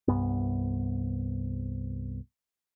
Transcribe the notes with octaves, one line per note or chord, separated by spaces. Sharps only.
C2 G2 B3